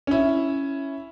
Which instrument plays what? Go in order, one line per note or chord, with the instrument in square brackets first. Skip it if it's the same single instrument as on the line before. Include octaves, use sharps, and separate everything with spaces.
[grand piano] C#4 E4